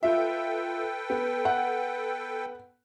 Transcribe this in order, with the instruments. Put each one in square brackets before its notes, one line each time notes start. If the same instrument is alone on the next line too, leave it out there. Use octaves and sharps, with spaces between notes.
[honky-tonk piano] F4 E5 [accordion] A4 B4 G5
[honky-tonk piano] B3
[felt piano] F#5